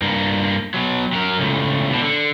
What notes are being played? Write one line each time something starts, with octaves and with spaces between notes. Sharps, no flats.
G2 A#3
B2 F#3
F#3 A#4
C#2 A2
B2 D4
D3